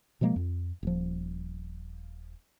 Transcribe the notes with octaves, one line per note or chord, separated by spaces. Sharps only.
B2 F3 G#3 A#3
F2
D#1 F3